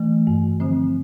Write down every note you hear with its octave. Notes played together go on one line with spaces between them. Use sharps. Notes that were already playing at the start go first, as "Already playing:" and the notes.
Already playing: E3 A3
G2
D3 F3 C4